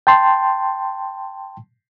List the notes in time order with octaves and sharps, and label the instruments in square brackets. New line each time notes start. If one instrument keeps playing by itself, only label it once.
[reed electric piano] G5 A5 C6